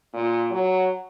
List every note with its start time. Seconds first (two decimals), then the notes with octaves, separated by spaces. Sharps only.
0.14 A#2
0.51 F#3